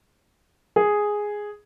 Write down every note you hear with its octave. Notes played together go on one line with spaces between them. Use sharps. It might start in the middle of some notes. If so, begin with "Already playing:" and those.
G#4